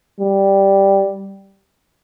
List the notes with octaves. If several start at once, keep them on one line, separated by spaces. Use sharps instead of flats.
G3